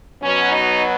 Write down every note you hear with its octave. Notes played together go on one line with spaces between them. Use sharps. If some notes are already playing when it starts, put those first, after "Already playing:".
B2 F#3 B3 C#4
D#4